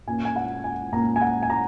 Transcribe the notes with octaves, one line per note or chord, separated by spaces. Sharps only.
A#2 A#3 C#4 G#5
G#5
F#5
G#5
A#2 A#3 C#4 A#5
G#5
F#5
G#5
A#5